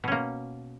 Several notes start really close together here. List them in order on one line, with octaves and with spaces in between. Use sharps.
B2 C#4 A#3